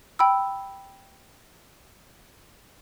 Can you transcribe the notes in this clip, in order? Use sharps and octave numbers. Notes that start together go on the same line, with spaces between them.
G5 B5 E6